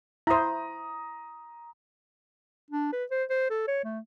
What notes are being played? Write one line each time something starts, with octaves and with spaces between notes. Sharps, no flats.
E4 C5 A#5 D#6
D4
B4
C5
C5
A4
C#5
A3